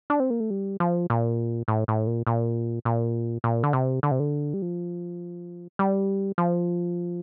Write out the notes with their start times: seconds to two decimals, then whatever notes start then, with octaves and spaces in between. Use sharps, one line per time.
0.10 D4
0.20 C4
0.30 A#3
0.40 A3
0.50 G3
0.80 F3
1.10 A#2
1.68 A2
1.88 A2
2.07 A#2
2.27 A#2
2.85 A#2
3.44 A#2
3.63 D3
3.73 C3
4.03 D3
4.11 C3
4.20 D3
4.54 G3
4.62 F3
5.79 G3
6.38 F3